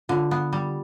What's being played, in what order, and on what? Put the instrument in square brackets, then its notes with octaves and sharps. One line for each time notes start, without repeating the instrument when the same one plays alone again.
[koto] D3 [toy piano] F4
[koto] B3
G3